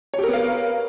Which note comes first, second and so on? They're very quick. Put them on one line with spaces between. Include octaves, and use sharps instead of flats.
C#5 G4 A#4 B3 F5